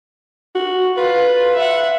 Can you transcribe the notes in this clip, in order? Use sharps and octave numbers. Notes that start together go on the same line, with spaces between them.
F#4
F4 B4
E5 F#5